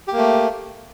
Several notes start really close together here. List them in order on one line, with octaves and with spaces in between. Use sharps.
G4 A#3 A3